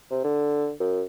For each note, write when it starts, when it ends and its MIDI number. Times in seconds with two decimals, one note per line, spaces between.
0.11 0.21 48
0.24 0.72 50
0.80 1.03 42